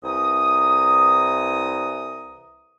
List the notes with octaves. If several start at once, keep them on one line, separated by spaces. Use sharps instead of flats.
C2 E3 A#5 D#6